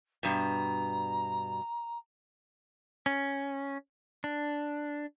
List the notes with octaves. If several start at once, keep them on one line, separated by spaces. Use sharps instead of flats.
G2 B2 A#5
C#4
D4